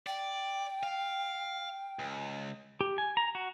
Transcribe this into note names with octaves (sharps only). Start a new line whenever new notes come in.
D5 G5
F5
C#2
G4
G#5
A#5
F#4